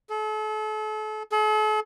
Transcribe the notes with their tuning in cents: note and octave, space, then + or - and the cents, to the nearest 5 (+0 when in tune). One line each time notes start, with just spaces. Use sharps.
A4 -40
A4 -45